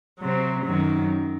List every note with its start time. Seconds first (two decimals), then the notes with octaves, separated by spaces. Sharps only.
0.20 C3 F#3 C4
0.65 F#2 D#3 F#3